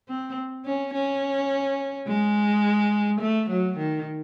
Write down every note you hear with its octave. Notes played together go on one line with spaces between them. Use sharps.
C4
C#4
C#4
G#3
A3
F#3
D#3